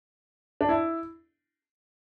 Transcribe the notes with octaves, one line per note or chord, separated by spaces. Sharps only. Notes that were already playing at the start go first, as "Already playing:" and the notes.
D4
E4